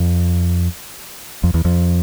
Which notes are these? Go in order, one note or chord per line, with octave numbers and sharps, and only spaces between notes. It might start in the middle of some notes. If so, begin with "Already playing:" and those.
Already playing: F2
F2
E2
F2